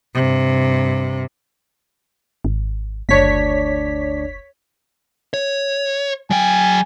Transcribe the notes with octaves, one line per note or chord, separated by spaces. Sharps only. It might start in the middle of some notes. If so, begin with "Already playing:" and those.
G2 C3
G#1
F#1 D2 D4 C#5 D5 B6
C#5
F#3 G5 G#5